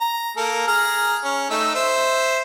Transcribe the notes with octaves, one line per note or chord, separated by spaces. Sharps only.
A#5
A#3 A4 A#4
G#4 A#5 F6
C#4
A3 D#4 E6
C5 E5